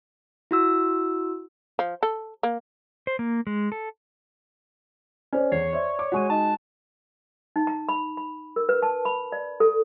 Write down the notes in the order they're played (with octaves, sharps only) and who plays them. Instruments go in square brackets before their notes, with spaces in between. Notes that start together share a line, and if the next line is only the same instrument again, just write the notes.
[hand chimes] E4 F#4 E6
[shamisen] F3
A4
A#3
[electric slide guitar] C5
A#3
G#3
A4
[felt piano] C#4 [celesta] A4 C5 D5
[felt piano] E2 [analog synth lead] C#5 [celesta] C7
[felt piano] C5 E5 [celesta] D5
[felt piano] D6
[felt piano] G#3 F#4 [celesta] F#5 C#6 D#7
[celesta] D#4 D#5 [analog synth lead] A5
[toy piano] D#4
A#5
B5
B5
A#4
B4
A5
B5
D5
A4